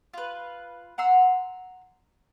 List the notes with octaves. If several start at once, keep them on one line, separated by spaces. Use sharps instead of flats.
F4 B4
F#5 A#5 C6 E6